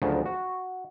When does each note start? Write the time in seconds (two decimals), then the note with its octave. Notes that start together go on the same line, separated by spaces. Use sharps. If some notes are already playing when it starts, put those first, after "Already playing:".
0.02 D2 C#3 F3 F#3
0.26 F#4